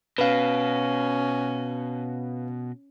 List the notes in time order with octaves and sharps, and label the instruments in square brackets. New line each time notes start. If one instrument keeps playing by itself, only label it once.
[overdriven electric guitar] B2 [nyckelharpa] C#4 [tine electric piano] B4 F5